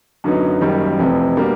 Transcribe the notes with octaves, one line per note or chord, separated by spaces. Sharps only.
F#2 D3 F#3 B3 D#4
F#1 F#2 D#3 G3
F1 F2 C3 E3
B2 G3 A#3 D4